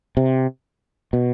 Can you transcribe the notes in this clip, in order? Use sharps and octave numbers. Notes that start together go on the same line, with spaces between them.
C3
B2